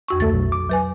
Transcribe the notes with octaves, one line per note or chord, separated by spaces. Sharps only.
F2 F#4 C#6
D2 A3 A4 A6
B1
D6
F#3 B4 G#5